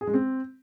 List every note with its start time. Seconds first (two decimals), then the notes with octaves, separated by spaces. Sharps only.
0.01 G#4
0.07 G#3
0.14 C4